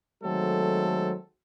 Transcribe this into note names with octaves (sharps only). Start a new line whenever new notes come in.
D#3 F#3 G#3 A3 C4 A4